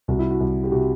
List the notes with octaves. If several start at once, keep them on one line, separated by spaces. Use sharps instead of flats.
C2 F#4
E4
F#4
C2
G4
C3 F#4